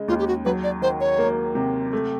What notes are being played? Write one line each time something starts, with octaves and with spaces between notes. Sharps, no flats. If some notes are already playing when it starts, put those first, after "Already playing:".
Already playing: C#3 G#3
D#2 F4
G4
F#4
F#3 B4
D5
D#3 C5
C#5
A#3
C3
A3